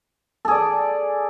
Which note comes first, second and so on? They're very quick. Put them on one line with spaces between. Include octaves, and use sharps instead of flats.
A4 G#4 D5